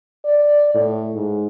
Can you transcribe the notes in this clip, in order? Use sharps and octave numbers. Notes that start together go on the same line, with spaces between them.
D5
A2
G#2